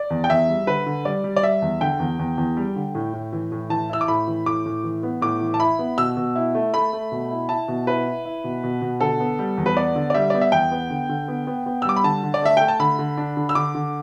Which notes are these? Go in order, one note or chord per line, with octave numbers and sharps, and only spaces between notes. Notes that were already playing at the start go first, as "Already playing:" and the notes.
Already playing: D5
E2
G5
E2 E5
G3
D3 B4
D3
G3 D5
G3
D5
G3 E5
E2
D3 G5
E2
E2
E2
G3
D3
A2
A2
E3
A2
E3 A5
E4 E6
D6
A2 B5
E3
A2 D6
A2
E3
B3
A2 D6
E3
A5
E4 B5
B3
B2 E6
B2
E4
A3
A3 B5
A3
B2
E4
E4 A5
B2
E4 B4
E4
E4
B2
B2
B2
D3 A4
B3
G3
E2
B4
B3 D5
D3
D5
G3 E5
B3 D5
E5
E2 G5
B3
D3
D3
B3
B3
B3
E6
G3 D6
B5
D3 A5
D3
D5
A3 E5
A3 G5
A5
D3 B5
D3
D4
D3
E6
D3 D6
D3